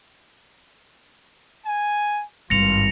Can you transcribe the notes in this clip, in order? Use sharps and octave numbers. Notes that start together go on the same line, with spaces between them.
G#5
G#1 G2 F4 A#6 C#7 F7